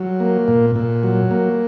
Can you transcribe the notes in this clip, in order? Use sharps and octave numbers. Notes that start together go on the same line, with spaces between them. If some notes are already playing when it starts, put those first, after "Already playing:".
Already playing: F#3
A#3
A#2
A#2
F#3
A#3